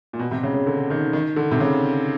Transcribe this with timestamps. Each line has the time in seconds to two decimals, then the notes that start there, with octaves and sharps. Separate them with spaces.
0.13 A#2
0.19 B2
0.31 C3
0.43 C#3
0.54 C#3
0.66 D3
0.90 D#3
1.13 D#3
1.36 D3
1.51 C3
1.60 C#3